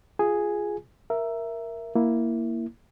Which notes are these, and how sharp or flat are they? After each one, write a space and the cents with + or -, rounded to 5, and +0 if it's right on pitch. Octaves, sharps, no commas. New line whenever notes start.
F4 -5 G#4 +0 G#5 +0
A#4 +0 E5 +10
A#3 +0 E4 +0